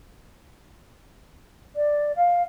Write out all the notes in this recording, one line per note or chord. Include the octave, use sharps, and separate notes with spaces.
D5
F5